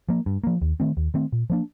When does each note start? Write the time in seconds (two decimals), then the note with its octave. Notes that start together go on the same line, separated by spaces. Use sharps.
0.09 F3 A#3
0.26 G2
0.44 F3 A#3
0.62 D#2
0.80 D#3 A3 C4
0.97 D#2
1.14 D#3 A3 C4
1.32 A#2
1.50 F3 A#3 D4